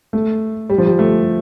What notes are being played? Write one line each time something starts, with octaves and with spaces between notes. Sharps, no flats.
A3
G3
F3
G3
A3